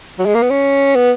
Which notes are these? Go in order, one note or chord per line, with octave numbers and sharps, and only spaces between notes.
F#3
G#3
A#3
B3
C#4
B3